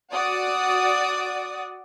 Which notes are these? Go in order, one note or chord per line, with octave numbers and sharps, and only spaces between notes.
F#4 D5 D#6